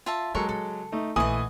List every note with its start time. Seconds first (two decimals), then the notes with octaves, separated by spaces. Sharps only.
0.06 F4 E5 A5
0.34 F#3 G#3 A#3 D4 A4 A#4 C#6
0.49 C#3 A4
0.92 A3 D#4
1.16 A#1 E3 A3 B4 D#5 F#5 G#5 D#6